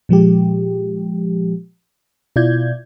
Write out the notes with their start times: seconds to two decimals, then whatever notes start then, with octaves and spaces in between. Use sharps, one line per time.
0.09 A#2 F3 G#3 G4
2.36 B2 E4 F4 D5 G6 G#6